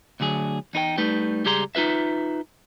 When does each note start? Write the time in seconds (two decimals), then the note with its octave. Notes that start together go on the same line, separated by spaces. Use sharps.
0.20 D2 D3 F#3 G#4
0.73 E2 D#4 A#4 G5
0.98 G3 A3 D#4 B4
1.45 C#2 G3 G4 G#4 A#5 C6
1.75 D#4 F4 B4 E5